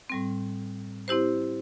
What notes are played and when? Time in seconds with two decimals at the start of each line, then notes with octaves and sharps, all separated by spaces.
0.10 A2 G3 C4
1.08 C4 E4 G4 C5